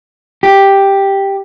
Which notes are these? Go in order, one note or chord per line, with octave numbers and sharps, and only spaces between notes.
G4